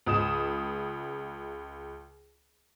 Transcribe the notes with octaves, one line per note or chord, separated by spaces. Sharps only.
C#2 D#6 E7